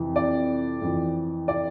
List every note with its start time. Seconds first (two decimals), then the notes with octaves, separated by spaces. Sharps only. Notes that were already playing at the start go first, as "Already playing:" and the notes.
Already playing: F2 C3 E3
0.16 D5
0.82 F2 E3
1.48 D5